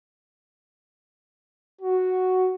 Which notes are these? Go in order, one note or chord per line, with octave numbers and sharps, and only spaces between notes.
F#4